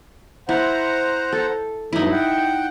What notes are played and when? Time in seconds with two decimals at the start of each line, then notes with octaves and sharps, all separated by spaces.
0.49 E4 C5 F#5 A#5
1.33 A4
1.93 G2 F#3 D#4 E4
2.12 F#5 G5